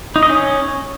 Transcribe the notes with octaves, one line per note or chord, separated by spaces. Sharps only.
D#4
D#5
C#4